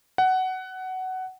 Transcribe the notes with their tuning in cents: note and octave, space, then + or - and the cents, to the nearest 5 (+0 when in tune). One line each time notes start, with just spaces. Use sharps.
F#5 +15